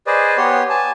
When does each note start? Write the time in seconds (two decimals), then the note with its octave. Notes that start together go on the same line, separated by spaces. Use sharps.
0.07 G#4 B4 C5 D5 D#5
0.38 B3 G4 C#5 C6
0.70 G#5 A5